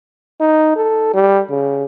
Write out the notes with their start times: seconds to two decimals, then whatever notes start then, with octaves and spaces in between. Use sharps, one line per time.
0.40 D#4
0.76 A4
1.14 G3
1.50 C#3